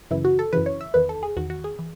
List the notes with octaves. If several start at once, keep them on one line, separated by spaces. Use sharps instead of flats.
F#2 C#3 E3 E4
F#4
A4
F#2 C#3 E3 B4
C#5
E5
E2 D#3 B4
A4
G#4
E2 D#3 F#4
F#4
G#4
E3